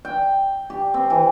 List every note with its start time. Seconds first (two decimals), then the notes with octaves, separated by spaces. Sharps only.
0.05 G5
0.70 G4
0.94 C4
1.10 E3